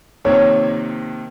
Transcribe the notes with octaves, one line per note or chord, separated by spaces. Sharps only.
F2 C3 D#3 A#3 C#5